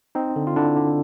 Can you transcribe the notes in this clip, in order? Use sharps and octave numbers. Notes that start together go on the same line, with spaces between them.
C4 D#4
D3
F4
D3 D4 E4
D3